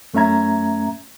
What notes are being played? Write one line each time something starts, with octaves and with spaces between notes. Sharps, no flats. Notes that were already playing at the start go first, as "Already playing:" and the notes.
F#2 A3 C#4 E5 A#5 G#6